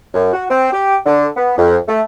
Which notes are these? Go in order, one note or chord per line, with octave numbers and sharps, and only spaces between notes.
F#2
F#4
C4
G4
D3
B3
F2
A3